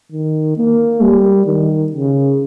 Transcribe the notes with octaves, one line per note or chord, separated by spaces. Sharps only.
D#3
A#3
G3
D#3
C#3